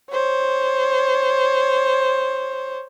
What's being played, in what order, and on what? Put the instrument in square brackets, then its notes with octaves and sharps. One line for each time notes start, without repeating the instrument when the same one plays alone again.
[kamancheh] C5 C#5